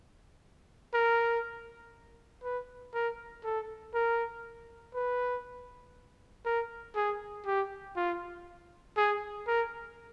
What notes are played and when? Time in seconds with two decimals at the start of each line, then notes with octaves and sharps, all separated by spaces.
0.94 A#4
2.44 B4
2.94 A#4
3.44 A4
3.94 A#4
4.94 B4
6.45 A#4
6.95 G#4
7.46 G4
7.96 F4
8.97 G#4
9.47 A#4